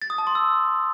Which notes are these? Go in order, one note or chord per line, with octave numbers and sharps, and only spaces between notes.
A6
D#6
A5
C6
E6